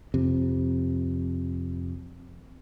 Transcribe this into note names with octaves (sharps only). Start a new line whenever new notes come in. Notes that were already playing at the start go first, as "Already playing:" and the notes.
F2 C3